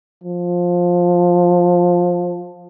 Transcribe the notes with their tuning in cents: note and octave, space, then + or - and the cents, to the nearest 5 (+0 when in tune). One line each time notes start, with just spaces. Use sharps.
F3 +15